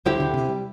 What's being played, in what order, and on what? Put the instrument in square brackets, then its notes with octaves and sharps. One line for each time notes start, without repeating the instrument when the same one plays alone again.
[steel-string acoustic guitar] D2 D3 [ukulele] E4 G4 C5 G5
[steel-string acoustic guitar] D2 D3
C3
G3